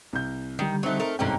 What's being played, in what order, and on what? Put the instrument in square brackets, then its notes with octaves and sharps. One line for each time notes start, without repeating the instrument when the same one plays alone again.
[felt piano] C2 G6
[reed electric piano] D3 G3 [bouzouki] D#3
[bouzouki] F#3 A3 [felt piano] C4 D#4 C5
[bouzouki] A3 A#4
[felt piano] G1 C2 G#2 [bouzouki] D3 G3 C#4 [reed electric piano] G5 A#5